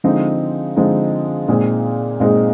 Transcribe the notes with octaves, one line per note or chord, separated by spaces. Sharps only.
D3 F3 G#3 C4 D#4
D3 F3 G#3 C4 D#4
A#2 G#3 C4 D#4 G#4
A#2 G#3 C4 D#4 G#4